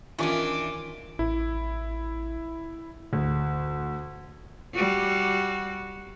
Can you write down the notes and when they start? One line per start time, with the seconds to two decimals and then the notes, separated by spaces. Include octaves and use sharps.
0.19 D#3 E3 C#4 D4 F4 D6
1.19 A1 E4
3.13 D2
4.74 G3 F#4